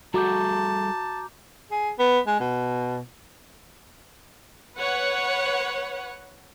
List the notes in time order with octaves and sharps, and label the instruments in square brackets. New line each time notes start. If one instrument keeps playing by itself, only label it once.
[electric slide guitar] G3 G#4 A4 [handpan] F#4 [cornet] A5 [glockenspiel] A#5 D6 G6
[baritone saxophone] G#4
B3
G#3
B2
[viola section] B4 C#5 F#5